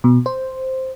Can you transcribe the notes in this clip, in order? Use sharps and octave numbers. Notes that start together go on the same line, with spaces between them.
B2
C5